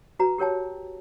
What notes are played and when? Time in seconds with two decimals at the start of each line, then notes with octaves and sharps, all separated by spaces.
0.19 F#4 B4 A#5
0.38 G4 A#4 C#5 G5 A5